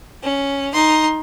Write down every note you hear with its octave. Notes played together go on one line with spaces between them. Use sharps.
C#4
D#4 C6